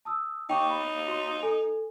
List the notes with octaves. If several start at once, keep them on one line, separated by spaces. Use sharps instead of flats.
A5 D#6 E6
D#4 G5 C#6 D6
B5
F#4 C6
A4 G#5